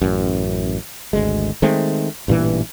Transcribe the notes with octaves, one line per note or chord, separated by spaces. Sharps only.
A1 F#2
G#1 D2 G#3
D#3 G#3 A3 C4
A1 G2 A#2 E3